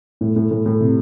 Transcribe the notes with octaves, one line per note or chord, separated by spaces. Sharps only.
A2
A2
A2
A2
C3